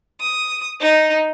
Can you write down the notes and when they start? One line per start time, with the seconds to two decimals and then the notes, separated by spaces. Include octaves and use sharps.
0.21 D#6
0.80 D#4